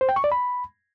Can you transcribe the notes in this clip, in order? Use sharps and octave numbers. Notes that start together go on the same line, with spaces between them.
C5
G5
C#6
D5
B5